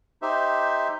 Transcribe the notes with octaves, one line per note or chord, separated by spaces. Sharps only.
D#4 G4 C5 E5